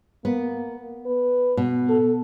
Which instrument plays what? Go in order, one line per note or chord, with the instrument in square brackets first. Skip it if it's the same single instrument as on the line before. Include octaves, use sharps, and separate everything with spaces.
[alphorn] A#3 [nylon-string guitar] B3
[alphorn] B4
[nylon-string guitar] B2
[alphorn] A4